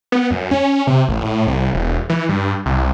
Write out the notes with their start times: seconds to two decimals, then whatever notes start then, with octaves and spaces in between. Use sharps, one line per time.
0.12 B3
0.31 F#2
0.51 C#4
0.87 C3
1.08 A1
1.21 A2
1.47 C2
1.73 E1
2.09 E3
2.29 G2
2.66 C2